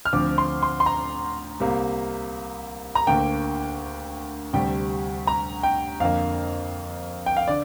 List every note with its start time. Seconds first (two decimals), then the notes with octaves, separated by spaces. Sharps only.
0.05 F6
0.13 D2 D3 F3 C4 D6
0.38 C6
0.62 C6
0.80 C6
0.86 A#5
1.60 C2 C3 A#3
2.95 A#5
3.07 D2 D3 A#3 G5
4.53 D2 C3 G3 G5
5.27 A#5
5.63 G5
6.00 F2 D3 A#3 F5
7.26 G5
7.37 F5
7.48 D3 D5